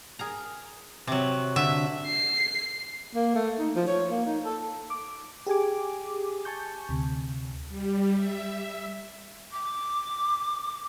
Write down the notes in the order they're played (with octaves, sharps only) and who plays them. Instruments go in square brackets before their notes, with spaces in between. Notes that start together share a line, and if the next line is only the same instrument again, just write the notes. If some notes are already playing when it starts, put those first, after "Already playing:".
[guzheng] G#4 A#4 A#5
[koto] C3 F#3
[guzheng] D3 [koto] E5
[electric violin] C7
[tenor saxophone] A#3
A3
D#4
F3
C#5
A#3
D#4
A4
[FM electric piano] D6
G4 G#4 G#5 D6
G#5 A5 C#6 G6
D2 C3
[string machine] G3
E5
[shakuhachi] D6